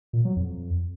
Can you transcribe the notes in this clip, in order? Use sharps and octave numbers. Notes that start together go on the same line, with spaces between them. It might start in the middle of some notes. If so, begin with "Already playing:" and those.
A#2
F#3
F2